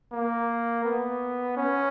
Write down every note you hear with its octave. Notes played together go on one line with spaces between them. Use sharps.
A#3
B3
C#4